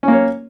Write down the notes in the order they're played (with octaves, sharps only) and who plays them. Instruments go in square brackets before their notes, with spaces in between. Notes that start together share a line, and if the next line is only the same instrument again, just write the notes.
[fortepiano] C#4
A#3
C#5